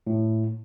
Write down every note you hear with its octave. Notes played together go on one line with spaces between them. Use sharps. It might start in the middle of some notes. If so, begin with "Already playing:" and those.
A2